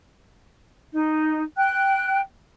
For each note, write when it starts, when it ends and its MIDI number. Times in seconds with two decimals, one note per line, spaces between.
0.93 1.43 63
1.57 2.20 79
1.57 2.20 90